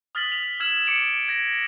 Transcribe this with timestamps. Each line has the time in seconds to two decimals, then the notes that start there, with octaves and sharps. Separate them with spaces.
0.15 D#6 F6 A6 B6 F#7
0.32 F7
0.60 E6 F6 G#6 E7 F#7
0.86 D6 C#7 D7 F7 F#7
1.29 G#6 A#6